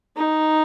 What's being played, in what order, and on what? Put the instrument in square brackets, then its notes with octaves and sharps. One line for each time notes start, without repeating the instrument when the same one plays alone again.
[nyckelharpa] D#4